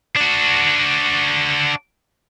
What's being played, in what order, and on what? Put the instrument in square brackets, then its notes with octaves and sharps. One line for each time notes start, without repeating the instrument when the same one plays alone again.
[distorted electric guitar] D4 F#4